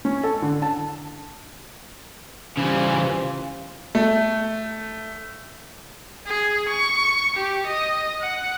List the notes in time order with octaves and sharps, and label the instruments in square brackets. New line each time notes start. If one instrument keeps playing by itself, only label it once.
[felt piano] C#4
A4
D3
A5
[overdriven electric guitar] C#3 E3 [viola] G3 G#5 [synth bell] C#4 [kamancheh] F4 C5
[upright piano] A3
[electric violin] G#4
C#6
G4
D#5
F#5